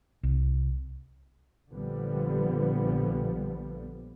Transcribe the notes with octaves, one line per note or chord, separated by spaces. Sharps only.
C2
A#1 D3 F3 G3 B3